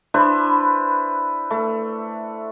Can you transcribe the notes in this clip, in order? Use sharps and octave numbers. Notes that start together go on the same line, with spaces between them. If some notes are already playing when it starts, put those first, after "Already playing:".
D4 E4 B4 C5
A3